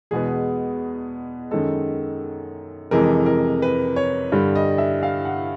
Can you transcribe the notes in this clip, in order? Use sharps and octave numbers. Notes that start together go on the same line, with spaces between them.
E2 B2 G#3 B3 G#4
F#2 D#3 G#3 A4
F2 C3 E3 G#3 A#4
A#4
B4
C#5
G2 D3 G3
D#5
E5
F5
F#5